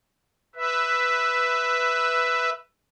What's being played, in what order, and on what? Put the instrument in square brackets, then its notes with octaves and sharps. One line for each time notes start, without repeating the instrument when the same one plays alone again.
[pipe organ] B4 E5